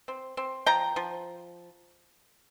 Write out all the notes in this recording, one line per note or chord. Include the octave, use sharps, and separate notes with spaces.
C4
C4
F3 G5 A#5
F3